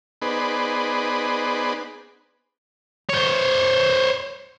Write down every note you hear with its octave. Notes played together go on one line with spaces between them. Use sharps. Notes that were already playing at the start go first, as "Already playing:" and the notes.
B3 D#4 G#4 B4 C5 D5
C5 C#5